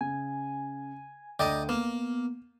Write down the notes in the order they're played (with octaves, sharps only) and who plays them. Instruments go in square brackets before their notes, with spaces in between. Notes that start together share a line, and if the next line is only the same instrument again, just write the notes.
[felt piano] C#3 [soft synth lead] G#5
[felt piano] D2 D#7 [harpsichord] D5 D#5 A#5 [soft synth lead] G5
[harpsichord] A#3 [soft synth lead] B3 [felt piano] E7